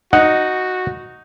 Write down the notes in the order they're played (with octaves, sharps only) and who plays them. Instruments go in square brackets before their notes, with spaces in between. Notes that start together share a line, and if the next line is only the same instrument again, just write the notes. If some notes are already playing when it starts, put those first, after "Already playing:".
[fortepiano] D#4 [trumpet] F#4 [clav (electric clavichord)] F#5